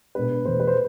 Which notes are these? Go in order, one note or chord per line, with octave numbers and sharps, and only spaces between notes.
B2 G#3 B3 D4 B4
E2 B2 A3 C5
B4
C5